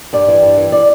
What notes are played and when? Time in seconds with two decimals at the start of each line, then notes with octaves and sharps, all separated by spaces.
0.13 G2 D5
0.28 E3
0.42 G2
0.58 E3
0.72 D5